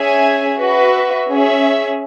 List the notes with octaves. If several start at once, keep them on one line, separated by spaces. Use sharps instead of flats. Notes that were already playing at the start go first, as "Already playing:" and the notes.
Already playing: C#4 G#4 E5 G#5
F#4 B4 E5
C#4 G#4 E5